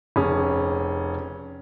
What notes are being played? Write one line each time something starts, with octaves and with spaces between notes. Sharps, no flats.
F1 C#4 G#4 D#6